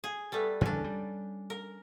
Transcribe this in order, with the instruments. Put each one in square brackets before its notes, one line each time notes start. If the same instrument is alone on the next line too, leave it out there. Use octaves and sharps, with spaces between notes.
[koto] G#4
G3 A3 B3
[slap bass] E2 G2 D3 [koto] C#4 D4
[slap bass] G3
[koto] A#4